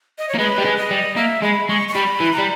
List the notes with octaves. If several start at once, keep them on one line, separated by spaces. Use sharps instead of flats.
D#5
C#5
A#3
G#3 B4
G3
G#3
D#5
G3
A#3 E5
G#3 B5
G#3 C#6
C#6
G3 B5
E3
A#5
G3